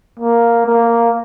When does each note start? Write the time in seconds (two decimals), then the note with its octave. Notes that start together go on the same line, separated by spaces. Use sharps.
0.19 A#3
0.67 A#3